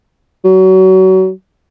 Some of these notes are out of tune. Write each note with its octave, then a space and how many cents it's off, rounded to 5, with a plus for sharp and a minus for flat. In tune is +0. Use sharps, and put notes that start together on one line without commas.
F#3 +30